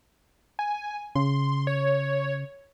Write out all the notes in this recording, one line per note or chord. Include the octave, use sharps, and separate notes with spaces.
G#5
C#3 C6
C#5